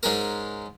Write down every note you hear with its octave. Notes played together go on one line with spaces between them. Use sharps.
G#2 G#3 C#4 A#4